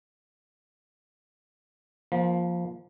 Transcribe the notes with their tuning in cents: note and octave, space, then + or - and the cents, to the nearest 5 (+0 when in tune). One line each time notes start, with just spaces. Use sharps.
F3 +0 A#3 +25